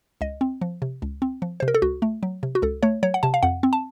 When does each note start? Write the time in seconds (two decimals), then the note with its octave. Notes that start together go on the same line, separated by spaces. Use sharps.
0.21 C#2 D#5
0.41 C4
0.61 F3
0.82 C3
1.02 C#2
1.22 C4
1.42 F3
1.60 C3 C5
1.68 A#4
1.75 A4
1.82 C#2 F#4
2.02 A3
2.23 F#3
2.43 C3
2.55 F#4
2.62 C#2 A4
2.83 A3 C#5
3.03 F#3 C#5
3.14 F#5
3.23 C3 A5
3.34 F5
3.43 F2 F#5
3.63 C4
3.73 A5